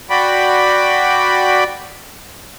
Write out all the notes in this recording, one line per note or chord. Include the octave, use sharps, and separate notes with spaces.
F#4 D5 G5 B5